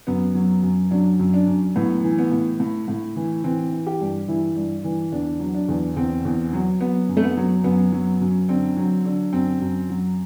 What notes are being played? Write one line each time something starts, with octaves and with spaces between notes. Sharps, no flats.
F#2 B3
F#3
F#2
F#3 D4
F#2
D4
F#2
A2 B3
E3
B3
A2
A2
A2
E3
E3 C4
E3
G4
G2
E3 E4
G2
E3
E2 D4
F#3
D4
E2
E2 C4
E2
F#3
F#3 B3
F#2
A3
B3
F#3
F#2 B3
F#3
F#2
D3 C4
F#3
D3
F#2 C4
F#2
F#3